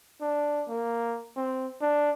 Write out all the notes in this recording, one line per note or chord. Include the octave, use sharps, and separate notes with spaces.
D4
A#3
C4
D4